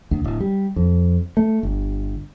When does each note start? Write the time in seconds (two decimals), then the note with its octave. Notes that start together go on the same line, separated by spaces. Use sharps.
0.11 D2
0.24 D1
0.40 G3
0.76 F2
1.37 A3
1.63 G1